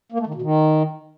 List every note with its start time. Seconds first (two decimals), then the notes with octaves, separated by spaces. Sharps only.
0.12 A#3
0.20 A3
0.27 D#3
0.34 B2
0.42 D#3